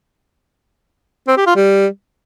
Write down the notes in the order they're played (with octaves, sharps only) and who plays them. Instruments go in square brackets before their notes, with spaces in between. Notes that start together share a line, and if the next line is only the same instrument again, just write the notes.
[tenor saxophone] C4
G4
F4
G3